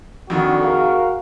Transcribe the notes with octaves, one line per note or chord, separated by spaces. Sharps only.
F2 D3 D#3 F#4
G#4 A#4 F5